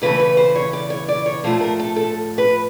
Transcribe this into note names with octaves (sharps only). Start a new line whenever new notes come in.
E2 C#3 E3 A3 B4
B4
C5
C#5
D5
C#5
D5
C#5
A2 F3 A3 C5
A#4
A4
A4
B4